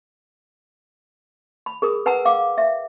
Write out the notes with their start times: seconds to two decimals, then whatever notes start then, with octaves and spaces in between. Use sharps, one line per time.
1.66 B5
1.82 G#4 A#4 D#6
2.06 B4 F#5 G#5 A#5 E6
2.25 F5 D6
2.58 E5